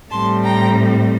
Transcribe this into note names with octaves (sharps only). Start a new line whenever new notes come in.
A2 G3 C4 A5 C6
G5 A#5